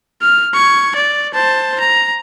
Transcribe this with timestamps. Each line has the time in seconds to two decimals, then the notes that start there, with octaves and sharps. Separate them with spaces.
0.22 F6
0.54 C#6 G#6
0.96 D5
1.34 C5 A5
1.80 A#5